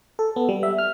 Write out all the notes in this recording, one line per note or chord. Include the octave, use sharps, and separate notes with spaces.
A4
B3
G3
E5
F6